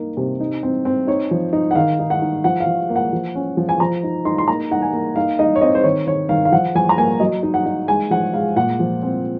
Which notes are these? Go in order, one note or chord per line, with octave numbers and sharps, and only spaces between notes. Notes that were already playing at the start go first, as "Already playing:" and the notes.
Already playing: A#3 D#4
C3
D#4
C4
C4
D#4 C#5
F3
D#4
F#5
D#3 F5
D#4
F#5
D#4
F3 F#5
F5
F3
A#3
F#5
F3
C#4
F3
G#5
F3 A#5
D#4
D#4 C6
C6
A#3 A#5
D#4 F#5
G#5
A#3
D#4 F5
D#4 D#5
C#5
C4 D#5
C5
D#3 C#5
D#3 C#5
D#3 F5
F5
F3 F#5
F3 G#5
A#5
A#3 G#5
F#3 D#5
D#4
F#5
D#4
G#3 G#5
F3 F#5
G#3 F5
A#2 F#5
F3
C4